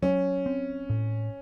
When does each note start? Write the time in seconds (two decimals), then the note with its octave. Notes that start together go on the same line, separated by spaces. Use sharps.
0.02 F#3 C#4
0.46 C4
0.90 A2